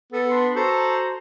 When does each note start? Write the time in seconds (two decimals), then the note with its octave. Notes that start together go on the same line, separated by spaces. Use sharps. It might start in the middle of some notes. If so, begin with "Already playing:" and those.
0.12 B3 A4
0.30 D4 B5 C6
0.56 F#4 A4 C5 A#5